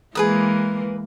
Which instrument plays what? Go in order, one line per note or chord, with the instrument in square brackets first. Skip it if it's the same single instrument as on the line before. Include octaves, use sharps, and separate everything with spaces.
[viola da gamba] E3 G#3 A#3 [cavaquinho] G#4 B4 D#6